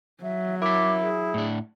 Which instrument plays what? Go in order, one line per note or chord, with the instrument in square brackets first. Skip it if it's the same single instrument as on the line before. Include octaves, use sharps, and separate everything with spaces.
[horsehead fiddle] F#3 [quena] E5
[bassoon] E4 [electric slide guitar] A#4 E5 [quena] D6
[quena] G#4
[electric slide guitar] A2 D4